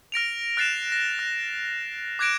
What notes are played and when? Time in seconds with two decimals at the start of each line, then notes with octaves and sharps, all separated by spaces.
0.12 F6 A#6 D7 F7
0.57 F6 F#6 A6 C7 D7 E7
0.92 A#6
1.19 F#6
2.19 D6 F#6 G#6 A#6 D7 E7